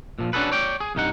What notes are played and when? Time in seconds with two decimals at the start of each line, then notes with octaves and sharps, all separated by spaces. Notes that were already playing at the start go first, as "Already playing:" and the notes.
0.19 A#2 F3
0.33 C#4 D4 F#4 G#4 A4 B4
0.52 C#5 D5 G5
0.80 G#4
0.95 C2 G2 D#4 F#5